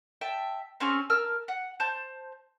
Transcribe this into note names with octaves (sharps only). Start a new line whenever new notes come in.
E5 G5 A5
C4 C#4 G#4 C#6
A#4 A5 E6 F6
F#5
C5 A5 G6